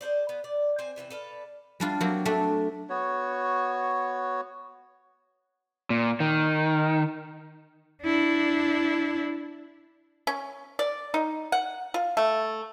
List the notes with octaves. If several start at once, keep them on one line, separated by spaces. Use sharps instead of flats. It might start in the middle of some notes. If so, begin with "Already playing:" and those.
G#4 A4 C5 D5
B3
D5
C4 C5 G#5
C3 E3 B3 C4
A4 B4 D5 F5
G3 D4 F4
F#3 A#3 C4
A3 D4 E5
B3 F#4 C#5
A#2
D#3
D4 E4
C#4
D5
D#4
F#5
F4
A3